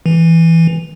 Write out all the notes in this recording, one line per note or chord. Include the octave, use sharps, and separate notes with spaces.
E3